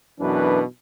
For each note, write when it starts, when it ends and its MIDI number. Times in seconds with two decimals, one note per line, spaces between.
0.20 0.64 35
0.20 0.64 42
0.20 0.64 47
0.20 0.64 52
0.20 0.64 62
0.20 0.64 71